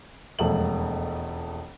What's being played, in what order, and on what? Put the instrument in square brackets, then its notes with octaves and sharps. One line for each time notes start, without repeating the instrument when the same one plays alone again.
[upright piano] E1 F2 A3 F#7